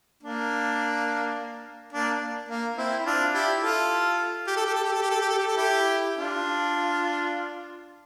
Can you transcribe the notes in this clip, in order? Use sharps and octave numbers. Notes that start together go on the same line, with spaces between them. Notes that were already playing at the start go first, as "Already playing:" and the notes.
A#3 D4
A#3 D4
A#3
C4 E4
E4
D4 F4
E4 G4
F4 A4
G4
A4
G4
A4
G4
A4
G4
A4
G4
A4
G4
A4
E4 G4
D4 F4